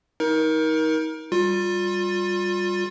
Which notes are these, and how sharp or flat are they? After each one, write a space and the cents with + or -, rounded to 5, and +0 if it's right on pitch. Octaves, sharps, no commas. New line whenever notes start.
D#4 +30 A#4 +20
G3 +0 F4 +25